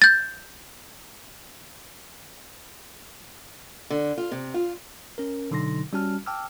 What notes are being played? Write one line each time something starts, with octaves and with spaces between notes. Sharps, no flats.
G6 A6
D3
F4
C3
F4
C#4 A#4
B2 D3 F#3 D#4 C6 A#6
G3 C#4 F#4 A5 F6
G5 A5 D6 E6 F6